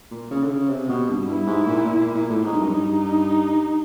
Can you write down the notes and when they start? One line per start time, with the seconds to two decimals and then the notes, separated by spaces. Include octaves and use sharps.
0.11 A#2
0.31 C#3
0.44 D3
0.50 C#3
0.70 C3
0.89 B2
1.09 G2
1.27 G2 E4
1.47 G#2
1.67 A#2
1.85 A#2
2.00 A#2
2.14 A#2
2.30 A2
2.44 G#2 D#4
2.52 G2
2.60 F#2
2.68 G2 D#4